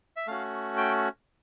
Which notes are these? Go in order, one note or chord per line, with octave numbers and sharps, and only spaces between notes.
E5
A3 C#4 F#4 F5
G5